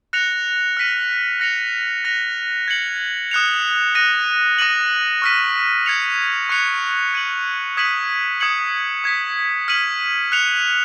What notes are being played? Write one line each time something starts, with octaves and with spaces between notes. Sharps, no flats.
F#6 A#6 C#7 F7
F6 B6 D#7
F#6 A#6 C#7 F7
F#6 A#6 F7
G#6 C#7 F#7
D#6 F#6 C#7 F7
F#6 A#6 D#7
D#6 A#6 D#7 F#7
C#6 F6 B6 D#7
G#6 C#7 F7
C#6 F#6 C#7 F7
G#6 D#7 F#7
D#6 G#6 B6 D#7 F#7
D#6 G#6 C#7 F#7
D#6 G#6 B6
F6 B6 D#7 F#7
F#6 C#7 F7